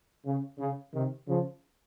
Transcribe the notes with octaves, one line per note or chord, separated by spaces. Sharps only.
C#3
C#3
C3 D#3
C#3 F3